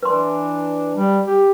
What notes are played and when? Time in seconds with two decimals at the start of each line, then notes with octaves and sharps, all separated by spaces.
0.03 E3 D4 B4 C6
0.96 G3
1.26 G4